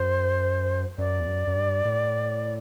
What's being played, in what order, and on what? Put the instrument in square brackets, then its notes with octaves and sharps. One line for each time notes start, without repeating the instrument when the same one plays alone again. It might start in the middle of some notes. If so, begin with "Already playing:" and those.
Already playing: [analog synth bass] F#2 [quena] C5
[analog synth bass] F#2 [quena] D5
[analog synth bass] E2
F#2
F#2
G2
A2